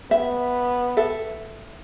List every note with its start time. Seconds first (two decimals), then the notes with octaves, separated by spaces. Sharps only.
0.11 B3 E5
0.97 A4 E5